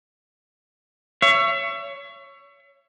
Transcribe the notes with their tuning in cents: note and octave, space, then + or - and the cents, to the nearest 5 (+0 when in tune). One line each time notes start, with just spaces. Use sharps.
C#5 +10 E5 +35